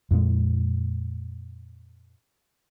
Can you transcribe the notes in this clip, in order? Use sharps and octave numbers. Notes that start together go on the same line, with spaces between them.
F2 A#2 G#3